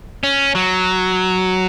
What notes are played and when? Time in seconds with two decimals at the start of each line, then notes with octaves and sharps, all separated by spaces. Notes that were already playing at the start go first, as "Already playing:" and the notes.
0.23 C#4
0.55 F#3